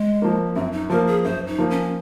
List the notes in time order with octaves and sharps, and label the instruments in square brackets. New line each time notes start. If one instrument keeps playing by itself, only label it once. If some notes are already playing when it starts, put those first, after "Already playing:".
Already playing: [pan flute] G#3
[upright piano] F3 A#3
[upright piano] F#2 [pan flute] C4
[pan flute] D#4
[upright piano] F3 A#3 [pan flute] A#4
[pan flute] G#4
[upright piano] F#2 [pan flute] C5
[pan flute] D#4
[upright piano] F3 A#3
[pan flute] C#4